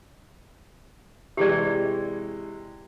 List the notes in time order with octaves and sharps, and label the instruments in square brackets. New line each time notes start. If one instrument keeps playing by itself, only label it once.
[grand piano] C3 E3 G#3 [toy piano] G4 G#4 D5